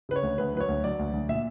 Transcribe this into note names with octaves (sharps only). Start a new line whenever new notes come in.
C#3 B4
C#5
D2
D2 B4
F#3 B4
C#5
D2
F#3 D5
D2
D2
A#2 E5